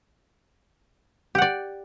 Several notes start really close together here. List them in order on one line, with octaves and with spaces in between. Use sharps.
G4 F#5 D5